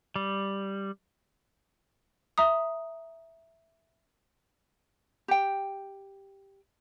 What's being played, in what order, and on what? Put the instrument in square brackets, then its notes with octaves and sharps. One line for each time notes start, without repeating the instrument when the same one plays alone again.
[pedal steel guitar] G3
[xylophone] E5 A#5 D#6
[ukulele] G4 G5